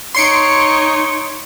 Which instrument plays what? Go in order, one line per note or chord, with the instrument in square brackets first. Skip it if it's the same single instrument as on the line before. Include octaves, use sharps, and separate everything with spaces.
[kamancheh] D#4 C#5 [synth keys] C6 C#7 D7